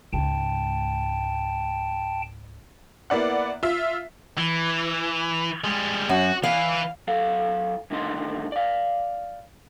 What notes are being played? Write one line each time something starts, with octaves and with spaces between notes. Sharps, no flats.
C#2 G#2 G5 A5
A#3 B3 E4 D5 F#5
F4 E5
E3
G3 G#3
F#2 F#4
E3 B4 F5
F#3 A4 F5
C2 A2 D3 D#3 D#4 C6
D5 F5